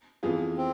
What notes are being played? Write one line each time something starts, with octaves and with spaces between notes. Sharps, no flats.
F2 E3 B3 F4 G#4
C4